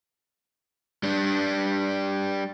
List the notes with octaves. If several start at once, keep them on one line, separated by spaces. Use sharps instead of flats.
G3 D4